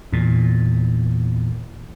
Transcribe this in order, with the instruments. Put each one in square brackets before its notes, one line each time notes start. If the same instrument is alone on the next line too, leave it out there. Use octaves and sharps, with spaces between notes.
[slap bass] E2 A#2